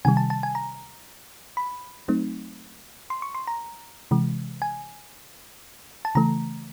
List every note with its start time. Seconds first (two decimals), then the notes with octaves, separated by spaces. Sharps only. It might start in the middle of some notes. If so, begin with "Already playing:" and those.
0.05 C3 D#3 G3 G#5
0.17 A5
0.30 A5
0.43 G#5
0.55 A#5
1.57 B5
2.08 F#3 A3 C4 D#4
3.10 C6
3.22 C#6
3.35 C6
3.47 A#5
4.11 C3 E3 G#3
4.62 G#5
6.05 A5
6.15 C#3 E3 A3 A#5